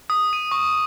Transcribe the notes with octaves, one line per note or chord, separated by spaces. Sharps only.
D#6
D#7
C#6